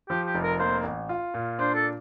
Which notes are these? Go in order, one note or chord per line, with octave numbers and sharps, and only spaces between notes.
F3 G4
G4
F1
A#4
A#3 C5
A1
F4
A#2
D4 C5
A4